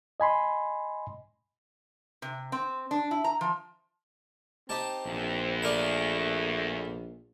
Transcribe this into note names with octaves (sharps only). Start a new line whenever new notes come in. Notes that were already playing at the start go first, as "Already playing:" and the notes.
D#5 G#5 B5 C6
C3
C4
D4
E4
A#5
F3
C4 D#4 G4 A5
A#1 E2
A3 D4 A#4 B5